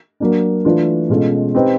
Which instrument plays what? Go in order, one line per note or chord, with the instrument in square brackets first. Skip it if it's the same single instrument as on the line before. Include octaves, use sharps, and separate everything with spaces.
[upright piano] F#3 A#3 D4
E3 A3 D4 F4
B2 G#3 C#4 F4 A4
C4 D#4 G4 B4